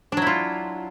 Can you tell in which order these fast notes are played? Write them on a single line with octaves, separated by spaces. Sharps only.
D4 F#3 E4 F4